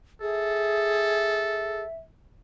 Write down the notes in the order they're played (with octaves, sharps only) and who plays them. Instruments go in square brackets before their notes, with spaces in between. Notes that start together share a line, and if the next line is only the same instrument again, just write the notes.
[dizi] G#4 [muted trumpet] A4 [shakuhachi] E5